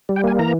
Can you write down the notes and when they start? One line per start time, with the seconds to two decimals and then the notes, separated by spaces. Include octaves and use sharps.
0.09 G3
0.16 G5
0.24 A#3 G#5
0.39 E3 A#5